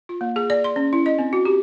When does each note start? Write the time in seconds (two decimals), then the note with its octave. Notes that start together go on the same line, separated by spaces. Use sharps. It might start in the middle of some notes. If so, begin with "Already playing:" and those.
0.09 F4
0.21 A#3
0.36 G#4
0.50 D5
0.64 C6
0.76 C#4
0.93 E4
1.06 D#5
1.19 C4
1.33 F#4
1.45 G4